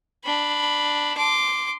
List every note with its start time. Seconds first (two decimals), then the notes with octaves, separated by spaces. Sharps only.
0.24 D4 B5
1.17 C6 D6